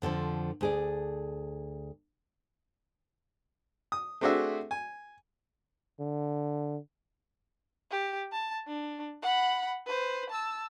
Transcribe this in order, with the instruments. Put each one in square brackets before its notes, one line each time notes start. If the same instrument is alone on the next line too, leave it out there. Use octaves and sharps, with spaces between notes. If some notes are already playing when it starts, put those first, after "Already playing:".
[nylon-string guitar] F2 D3 E3 F3
D2 G#4 D5
[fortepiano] D#6
A3 C4 D4 F#4 G#4 E5
G#5
[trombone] D3
[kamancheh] G4
A5
D4
F#5 B5
B4 C5
A5 E6